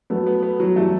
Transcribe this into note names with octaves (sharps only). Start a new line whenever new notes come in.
F#3 A3 B3
B3
B3
F#3
E3 G3 A3